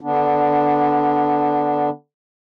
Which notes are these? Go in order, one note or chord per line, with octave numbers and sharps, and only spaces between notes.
D3 B3 D4